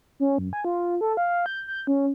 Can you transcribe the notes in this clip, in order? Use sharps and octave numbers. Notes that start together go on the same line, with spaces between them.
C#4
F#2
G#5
F4
A4
F5
G6
G6
C#4